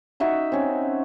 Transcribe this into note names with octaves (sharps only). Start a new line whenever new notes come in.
D#4 F#4 E5 A#5
C4 C#4